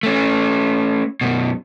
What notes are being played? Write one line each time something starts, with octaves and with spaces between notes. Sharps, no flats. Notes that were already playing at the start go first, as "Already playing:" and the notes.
A3 C#4
F#2 B2